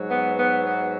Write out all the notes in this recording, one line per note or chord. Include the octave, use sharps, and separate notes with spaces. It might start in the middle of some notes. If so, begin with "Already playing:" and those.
Already playing: G#2 F#3
B3
B3
B3